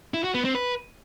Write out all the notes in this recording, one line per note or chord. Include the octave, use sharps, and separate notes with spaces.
E4
F#4
B3
C4
B4